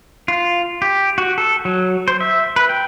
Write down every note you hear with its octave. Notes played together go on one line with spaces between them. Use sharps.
F4
G4
F#4
A4
F#3
C5
E5
B4
G5